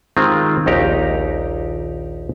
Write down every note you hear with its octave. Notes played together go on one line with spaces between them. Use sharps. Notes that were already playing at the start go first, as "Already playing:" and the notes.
D#3 G#3 C4 F4 G4
A#1 D#2 D#4 G4 A#5